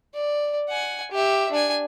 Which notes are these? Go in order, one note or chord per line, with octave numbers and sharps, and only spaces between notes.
D5
F#5 G#5
G4 E5
D4 G#5